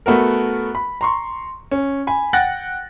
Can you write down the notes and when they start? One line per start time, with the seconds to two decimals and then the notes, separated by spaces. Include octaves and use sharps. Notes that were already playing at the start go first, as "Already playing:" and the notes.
0.06 A3 B3 F#4 A#4
0.75 B5
1.01 A#5 C6 C#6
1.71 C#4
2.07 G#5 B5
2.33 F#5 G5 F#6 A6 A#6